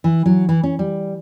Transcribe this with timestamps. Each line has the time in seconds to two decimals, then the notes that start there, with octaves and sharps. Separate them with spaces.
0.04 E3
0.26 F#3
0.49 E3
0.63 C#4
0.79 G3